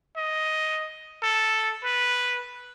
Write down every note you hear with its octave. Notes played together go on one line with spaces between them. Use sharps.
D#5
A4
B4